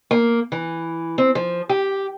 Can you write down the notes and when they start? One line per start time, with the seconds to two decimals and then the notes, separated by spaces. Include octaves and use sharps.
0.11 A#3
0.52 E3
1.18 C4
1.35 F3
1.69 G4